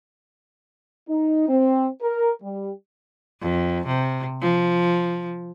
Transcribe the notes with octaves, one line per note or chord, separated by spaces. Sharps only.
D#4
C4
A#4
G3
F2
C3
F3